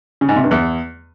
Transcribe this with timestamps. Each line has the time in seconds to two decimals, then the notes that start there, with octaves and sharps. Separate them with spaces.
0.21 C#3
0.29 G#2
0.36 C3
0.44 G2
0.51 E2